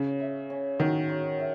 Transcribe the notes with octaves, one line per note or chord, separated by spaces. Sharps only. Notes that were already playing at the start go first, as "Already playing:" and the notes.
Already playing: C#3 C#5
E5
C#4
D#3 F#4
C#5
E5